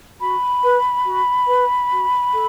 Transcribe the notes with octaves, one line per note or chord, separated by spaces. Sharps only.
F#4 B5
B4
F#4
B4
F#4
A4